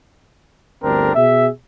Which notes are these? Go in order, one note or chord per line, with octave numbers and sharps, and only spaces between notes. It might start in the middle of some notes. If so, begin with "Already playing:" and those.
G1 D2 C4 D4 A#4
B2 G#4 E5